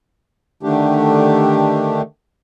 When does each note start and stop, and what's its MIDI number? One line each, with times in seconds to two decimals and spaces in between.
0.63 2.02 50
0.63 2.02 51
0.63 2.02 57
0.63 2.02 62
0.63 2.02 67